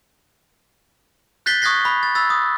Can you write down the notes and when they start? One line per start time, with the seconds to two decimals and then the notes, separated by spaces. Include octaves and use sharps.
1.46 F#6 G6 A6 B6 C7 G7
1.62 C#6 D#6 F#6 G#6 A#6 C7
1.85 B5
2.03 A6
2.15 B5 E6 A6
2.30 D#6